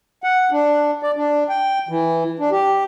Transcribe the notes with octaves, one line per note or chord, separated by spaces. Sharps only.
F#5
D4
D5
D4
G5
E3
D4
G4